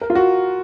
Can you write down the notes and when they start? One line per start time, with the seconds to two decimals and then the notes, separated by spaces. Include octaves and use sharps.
0.01 A#4
0.10 F4
0.15 F#4